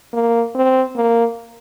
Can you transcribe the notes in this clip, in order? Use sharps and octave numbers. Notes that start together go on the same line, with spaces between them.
A#3
C4
A#3